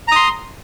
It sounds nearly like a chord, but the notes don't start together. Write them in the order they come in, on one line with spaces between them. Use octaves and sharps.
A#5 D#6 C6